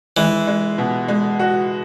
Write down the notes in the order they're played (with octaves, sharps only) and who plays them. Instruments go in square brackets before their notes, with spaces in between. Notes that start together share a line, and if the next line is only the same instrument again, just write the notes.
[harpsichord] E3 [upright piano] G#3
[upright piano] G#3
B2
G#3
F#4